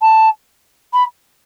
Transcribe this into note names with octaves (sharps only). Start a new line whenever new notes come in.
A5
B5